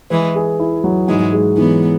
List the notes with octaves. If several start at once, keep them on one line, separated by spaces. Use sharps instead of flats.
E3 G#3 B4
G#4
E4
F#3
G#2 E3 G#3
G#3
E3 F#3 B3